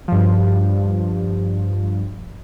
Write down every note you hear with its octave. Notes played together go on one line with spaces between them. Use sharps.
G2 F3